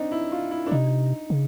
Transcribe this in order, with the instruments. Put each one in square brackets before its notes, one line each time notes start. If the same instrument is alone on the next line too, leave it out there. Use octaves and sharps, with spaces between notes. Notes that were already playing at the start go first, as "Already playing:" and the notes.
Already playing: [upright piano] C4 D4 D#4
E4
F4
E4
D4
[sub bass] C3 [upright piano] D#4
[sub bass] C#3